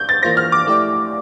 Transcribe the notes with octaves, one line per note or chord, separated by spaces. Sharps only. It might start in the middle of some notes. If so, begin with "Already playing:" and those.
Already playing: G6
A6
E3 A#3 F4 C5 A#6
F6
D6
A3 E4 G4 D5